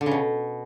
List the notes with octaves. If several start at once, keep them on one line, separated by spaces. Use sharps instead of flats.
D3
C#3
B2